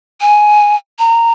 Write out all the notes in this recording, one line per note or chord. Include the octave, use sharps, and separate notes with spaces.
G#5
A#5